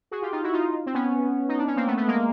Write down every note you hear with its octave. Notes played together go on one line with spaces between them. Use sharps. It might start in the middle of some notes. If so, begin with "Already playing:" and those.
F#4 G#4
F4 G4
D#4 F4
E4 F#4
D#4 F4
C4
B3 C#4
D#4
D4
C#4
A#3 C4
A3 B3
A3 B3
G#3 A#3